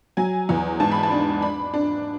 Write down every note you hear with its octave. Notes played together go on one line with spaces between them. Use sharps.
F#3 G#5
E2
G#2 A5
B5
A5
D4
D4 B5
D4